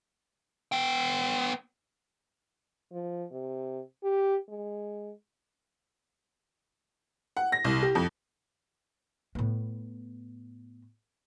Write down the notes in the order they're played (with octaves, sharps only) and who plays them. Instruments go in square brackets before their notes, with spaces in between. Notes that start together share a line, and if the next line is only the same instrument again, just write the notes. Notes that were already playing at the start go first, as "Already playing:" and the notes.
[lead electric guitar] B3 G5
[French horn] F3
C3
G4
G#3
[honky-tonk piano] F#5
A#6
C2
G4
F2
[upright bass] A2 B3